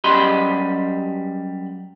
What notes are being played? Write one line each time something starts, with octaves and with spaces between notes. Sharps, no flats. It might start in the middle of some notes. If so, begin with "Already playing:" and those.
F#2 G3 G4 D#5 B5 C6